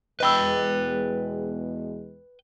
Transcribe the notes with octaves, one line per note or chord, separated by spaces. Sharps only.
E2 B2 G#3 B4 D#5 G5 B5 E6